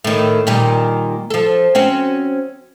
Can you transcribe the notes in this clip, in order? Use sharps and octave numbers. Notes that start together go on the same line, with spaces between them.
A2 D#3
A#2 D#3 G3
F3 A4
C4 C#4 F#4